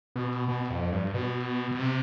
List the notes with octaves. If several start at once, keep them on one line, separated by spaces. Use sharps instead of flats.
B2
B2
F2
G2
B2
B2
C3